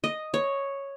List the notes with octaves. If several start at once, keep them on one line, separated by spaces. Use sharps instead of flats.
D#5
C#5